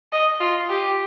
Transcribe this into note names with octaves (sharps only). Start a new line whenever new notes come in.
D#5
F4
G4